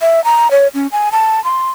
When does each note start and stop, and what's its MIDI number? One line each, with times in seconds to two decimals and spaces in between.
0.01 0.23 76
0.24 0.51 82
0.51 0.68 73
0.74 0.87 61
0.92 1.09 80
1.12 1.42 81
1.44 1.69 84